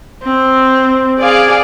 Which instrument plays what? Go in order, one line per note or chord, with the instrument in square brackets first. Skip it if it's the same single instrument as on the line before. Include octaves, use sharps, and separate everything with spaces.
[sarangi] C4
[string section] G#4 D5 F5